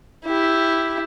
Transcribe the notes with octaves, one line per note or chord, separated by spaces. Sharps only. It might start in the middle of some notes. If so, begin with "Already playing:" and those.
E4 G4